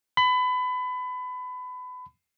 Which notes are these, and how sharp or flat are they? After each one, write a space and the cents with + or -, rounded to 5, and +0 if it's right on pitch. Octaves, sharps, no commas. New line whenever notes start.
B5 +25